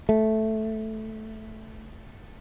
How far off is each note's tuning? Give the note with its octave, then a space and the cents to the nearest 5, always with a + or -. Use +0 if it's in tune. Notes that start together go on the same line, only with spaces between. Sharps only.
A3 -5